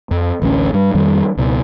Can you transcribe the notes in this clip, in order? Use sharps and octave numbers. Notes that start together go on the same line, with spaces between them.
F2
A1 D2 G3 C#4
G2 G3
F2 D#3 G3
C#2 B2